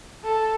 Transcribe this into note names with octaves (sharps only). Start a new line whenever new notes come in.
A4